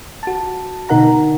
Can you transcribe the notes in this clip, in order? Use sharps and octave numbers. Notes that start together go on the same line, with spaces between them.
F#4 A5
B2 D3 D#4 A#4 F#5 A#5